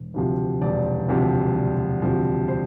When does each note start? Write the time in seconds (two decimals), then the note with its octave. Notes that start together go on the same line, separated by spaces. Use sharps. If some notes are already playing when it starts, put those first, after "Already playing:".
Already playing: E1
0.14 D2 C3 F3
0.61 E1 D5
1.08 D2 C3 F3
1.55 E1
2.02 D2 C3 F3
2.48 C5